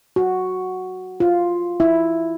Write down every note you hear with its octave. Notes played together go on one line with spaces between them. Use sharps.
F#4
F4
E4